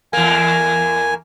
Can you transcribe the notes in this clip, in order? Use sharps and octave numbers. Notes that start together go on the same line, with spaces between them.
E2 A#3 G#5